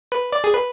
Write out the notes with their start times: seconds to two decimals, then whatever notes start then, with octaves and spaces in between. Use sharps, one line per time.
0.12 B4
0.32 D5
0.44 G#4
0.54 B4